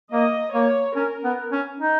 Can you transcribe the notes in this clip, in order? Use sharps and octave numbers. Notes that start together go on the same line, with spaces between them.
A#3 D#5
A#3 C#5
C#4 A#4
B3
C#4
D#4